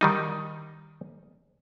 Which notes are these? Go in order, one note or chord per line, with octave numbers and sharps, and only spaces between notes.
D#3 G3 D#4